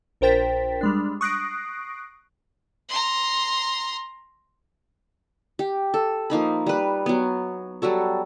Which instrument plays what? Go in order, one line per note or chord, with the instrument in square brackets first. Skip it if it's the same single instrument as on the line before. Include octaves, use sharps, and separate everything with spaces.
[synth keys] A#1 A#4 C5 G5 A6 B6
G3 G#3 D4
C#6 D#6 F#6 A#6 C7 D7
[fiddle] A#5 C6
[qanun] G4
A4
F3 A#3 D#4 B5
G3 B4
F#3 B3
F#3 G3 F#4 A4